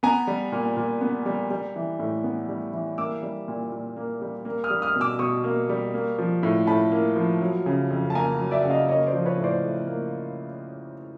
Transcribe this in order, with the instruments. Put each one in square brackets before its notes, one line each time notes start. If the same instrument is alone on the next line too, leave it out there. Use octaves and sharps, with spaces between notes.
[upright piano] B3 G#5 A#5
G3
A#2
A#2
B3
G3
G3
E3
A2
B3
G3
E3
A#3 D6 E6
G3
A#2
A#2
A#3
G3
A#3
D#6 F6
G3
D#6 F6
B2
D6 E6
B2 C#6 D#6
A#3
G3
A#3
F3
A2
A2 A5 B5
A#3
F3
F#3
C#3
F2
A5
A#3 G#5 A#5
F#3
D5 E5
C#3 F#5
D#5 F5
A#3 C#5 D#5
C5 D5
F3
B4 C#5
A2
C5 D5
A2
A#3